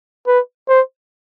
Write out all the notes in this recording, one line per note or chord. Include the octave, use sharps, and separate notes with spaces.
B4
C5